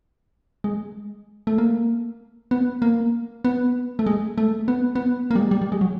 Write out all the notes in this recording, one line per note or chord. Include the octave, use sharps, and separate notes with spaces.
G#3
A3
A#3
B3
A#3
B3
A3
G#3
A3
B3
B3
A#3
G3
G#3
G3
G3
G#3
F#3